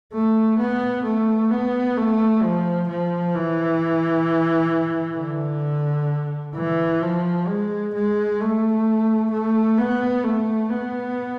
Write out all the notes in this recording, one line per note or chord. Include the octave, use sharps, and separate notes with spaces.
A3
B3
A3
B3
A3
F3
F3
E3
D3
E3
F3
G#3
G#3
A3
A3
B3
A3
B3